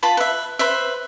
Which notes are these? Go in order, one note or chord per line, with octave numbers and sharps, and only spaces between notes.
F4 B4 A5 B5
B4 E5
B4 C5 E5